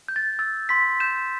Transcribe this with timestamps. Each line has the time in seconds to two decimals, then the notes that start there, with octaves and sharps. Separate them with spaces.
0.08 G6
0.16 A6
0.39 E6 A6
0.69 C6 B6
1.00 G6 E7